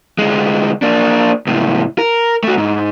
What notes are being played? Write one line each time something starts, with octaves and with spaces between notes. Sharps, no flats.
D2 G#3
A#3 D4
C#2 A2
A#4
A3 F#4
G#2